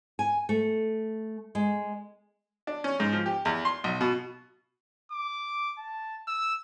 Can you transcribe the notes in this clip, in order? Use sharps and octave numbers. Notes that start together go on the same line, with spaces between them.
G#5
A3
G#3
D4
C#4
G#2
F3
G4
E2
C6
B1
B2
D6
A5
E6